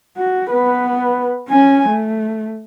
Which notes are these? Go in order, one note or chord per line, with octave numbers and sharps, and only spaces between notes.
F#4
B3 B4
C#4 G#5
A3